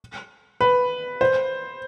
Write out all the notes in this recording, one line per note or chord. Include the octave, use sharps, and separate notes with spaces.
B4
C5